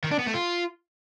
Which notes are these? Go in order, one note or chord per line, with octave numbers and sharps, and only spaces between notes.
D#3
D4
B3
A3
F4